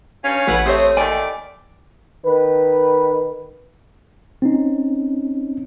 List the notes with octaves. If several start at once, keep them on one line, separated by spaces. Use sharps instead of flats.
G2 C#4 C#5 F5 G#5
A1 E4 B4 F#5
A3 C4 G4 C5 C#5 D#6
D#2 D#3 A3 D5 G5 G#5 D6
D#3 B4
C4 C#4 D#4